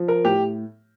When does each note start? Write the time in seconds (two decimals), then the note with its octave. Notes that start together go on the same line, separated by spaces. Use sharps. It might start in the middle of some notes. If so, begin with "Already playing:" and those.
Already playing: F3
0.08 A#4
0.25 A2 G4